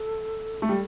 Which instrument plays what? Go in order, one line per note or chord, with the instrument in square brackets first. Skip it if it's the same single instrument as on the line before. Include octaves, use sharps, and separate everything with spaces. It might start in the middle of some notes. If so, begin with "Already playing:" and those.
Already playing: [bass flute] A4
[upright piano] A3
G3